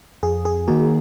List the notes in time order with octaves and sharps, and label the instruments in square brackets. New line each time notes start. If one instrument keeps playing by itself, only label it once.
[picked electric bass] F2 [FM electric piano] G#4
[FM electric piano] G#4
[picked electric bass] D#3 A#3 [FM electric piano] F#4